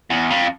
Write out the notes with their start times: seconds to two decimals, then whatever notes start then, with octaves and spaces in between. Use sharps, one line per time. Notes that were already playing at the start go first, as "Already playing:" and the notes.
0.10 E2
0.30 F2